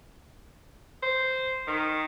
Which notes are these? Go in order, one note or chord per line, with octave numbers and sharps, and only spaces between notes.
C5
D#3